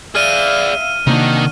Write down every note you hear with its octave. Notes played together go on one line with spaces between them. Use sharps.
G#4 D5 E5 F5 F6 D#7
C3 D#3 A#3 D4 D#4 F#4